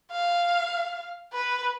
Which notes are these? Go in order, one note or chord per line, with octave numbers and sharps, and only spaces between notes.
F5
B4